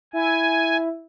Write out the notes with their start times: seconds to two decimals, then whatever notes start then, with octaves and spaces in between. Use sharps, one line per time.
0.13 E4 G#5